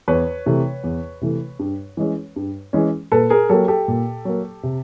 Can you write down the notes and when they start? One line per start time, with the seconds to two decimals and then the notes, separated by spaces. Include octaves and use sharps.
0.08 E2 B4 C#5
0.46 C3 E3 A3
0.84 E2
1.21 C3 E3 A3
1.59 G2
1.97 E3 G#3 C#4
2.36 G2
2.73 E3 G#3 C#4
3.12 A#2 A4 B4
3.30 G#4 A#4
3.49 F#3 A#3 G4 A4
3.68 G4 A4
3.88 A#2
4.25 F#3 A#3
4.63 C3